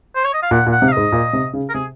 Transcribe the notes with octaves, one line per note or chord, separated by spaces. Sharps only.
C5
C#5
D#5
F5
A#2 F#5
A#2
F#5
C3
F5
G#2 D#5
A#2
C3
C#3
A#4
C3 G#4